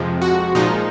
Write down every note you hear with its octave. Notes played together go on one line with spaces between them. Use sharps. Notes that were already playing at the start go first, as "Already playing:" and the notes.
Already playing: F2 C3 F3 G#3
F#4
A#2 F3 G#3 D#4